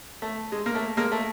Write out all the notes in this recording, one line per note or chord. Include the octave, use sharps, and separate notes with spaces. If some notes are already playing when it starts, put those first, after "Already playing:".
A3
G#3
A#3
A3
G#3 A#3
A3